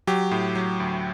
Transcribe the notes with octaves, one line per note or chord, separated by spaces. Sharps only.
F#3 G4
A2
F#3
D2